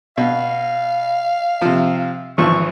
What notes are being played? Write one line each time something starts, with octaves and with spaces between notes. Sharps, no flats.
B2 F5
C3 F3
G#1 E3 F3 C#6